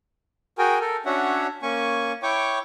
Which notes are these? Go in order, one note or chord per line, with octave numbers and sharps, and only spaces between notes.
F#4 G#4 A#4 G5 G#5
A4 A#4
C#4 D4 F#4 C#5 E5 F#5
A#3 C#4 G#5 C#6
E4 C#5 G5 C#6 D6